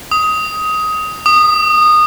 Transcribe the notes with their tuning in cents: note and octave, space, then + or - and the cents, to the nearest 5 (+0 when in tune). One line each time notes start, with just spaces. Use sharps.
D#6 +15
D#6 -20